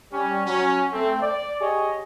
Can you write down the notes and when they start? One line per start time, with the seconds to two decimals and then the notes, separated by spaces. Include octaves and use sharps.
0.11 G3 C#4
0.47 F#3 C#4
0.93 A3 C4
1.22 D5
1.61 G4 G#4 C#5 D#5